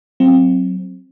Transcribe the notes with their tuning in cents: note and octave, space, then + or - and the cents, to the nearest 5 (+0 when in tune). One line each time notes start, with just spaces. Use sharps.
F#3 +0 C4 +15